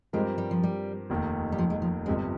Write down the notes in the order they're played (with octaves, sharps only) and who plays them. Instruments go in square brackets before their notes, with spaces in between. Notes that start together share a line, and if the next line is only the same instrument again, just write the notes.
[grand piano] G2 F3 C4 G4 A#4 [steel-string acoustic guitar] G#3
[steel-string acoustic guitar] G3
F3
G3
[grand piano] F1 D#2 D#3
[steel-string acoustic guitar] G3
F3
G#3
F3
[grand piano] G1 F2 C3 [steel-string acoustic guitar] G#3